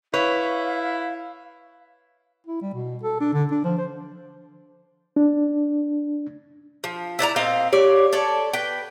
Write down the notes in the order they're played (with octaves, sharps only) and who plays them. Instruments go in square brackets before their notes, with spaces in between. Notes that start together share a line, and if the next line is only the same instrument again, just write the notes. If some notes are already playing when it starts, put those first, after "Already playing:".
[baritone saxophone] E4 [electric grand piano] B4 [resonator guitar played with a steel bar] C#5 [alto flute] F5
[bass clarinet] E4
G3
B2
A4
D4
D3
D4
F3
C5
[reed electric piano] D4
[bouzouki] F3
E4 D5 F5 A#5
A#2 C4 D#5 F5
G4 C#5 D5
A4 C#5 D5
B4 G5